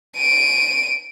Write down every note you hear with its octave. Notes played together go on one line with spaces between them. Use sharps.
D7 D#7